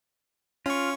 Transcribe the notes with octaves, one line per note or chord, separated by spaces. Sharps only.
C#4 F4 C#6